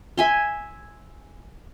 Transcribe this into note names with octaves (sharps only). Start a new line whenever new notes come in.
E5 G#5 C6